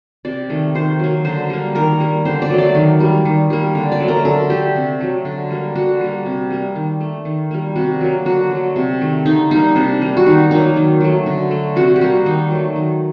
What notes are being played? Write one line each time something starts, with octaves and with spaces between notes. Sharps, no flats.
C3 D5
D#3 A3
D#3 C5
F#3 A#3
D3 C5
G3 A#3
D#3 A#4
G3 A#3
D3 C5
D5
F#3 A3
D5
D#3
G3 A#3
D#3
G3 A#3
D3
D5
F#3 A3
A#4
D3 A4
A3 G4
C3
F#3 A3
D3
G3 A#3
D3 F#4
G3 A#3
C3
G3 A#3
D#3
A3
D#3
G3 A#3
C3 F#4
F#3 A#3
D3 F#4
F#3 A3
C3
D#3 A3
D3 D#4
G3 A#3 D#4
C3 D4
G3 A#3
F#4
D#3 D#4
F#3 A#3 D#4
D#3
F#3 A3
D3
A3
C3 F#4
G4
G3 A#3 F#4
D#3 D#4
F#3 A3
D#3